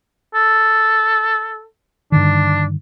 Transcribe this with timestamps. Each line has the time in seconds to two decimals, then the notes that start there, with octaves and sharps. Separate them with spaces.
0.35 A4
2.12 G2 D3 D#3 D4